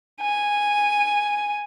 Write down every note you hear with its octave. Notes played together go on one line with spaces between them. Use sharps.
G#5